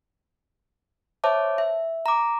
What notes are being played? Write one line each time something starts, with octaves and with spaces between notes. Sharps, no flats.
C5 C#5 E5 A5 D6
E5
A#5 D6